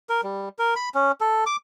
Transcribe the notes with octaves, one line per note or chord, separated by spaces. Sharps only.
A#4
G3
A#4
B5
C#4
A4
D6